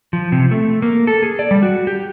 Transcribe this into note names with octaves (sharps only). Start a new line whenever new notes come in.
F3
C3
A3
A#3
A4
G#4
D5
G3
F#4
G4